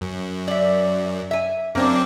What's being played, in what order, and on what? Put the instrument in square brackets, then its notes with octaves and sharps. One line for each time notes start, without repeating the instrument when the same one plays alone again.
[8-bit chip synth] F#2
[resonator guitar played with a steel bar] D5 E5
E5 G#5
[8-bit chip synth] F#2 C4 [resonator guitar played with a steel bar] A#3 D4